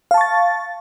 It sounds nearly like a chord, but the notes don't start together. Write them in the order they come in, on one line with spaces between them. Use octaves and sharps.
F5 A5 C#6 A6